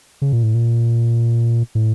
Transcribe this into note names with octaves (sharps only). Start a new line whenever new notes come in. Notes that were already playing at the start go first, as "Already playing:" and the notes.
C#3
A#2
A2
A#2
A2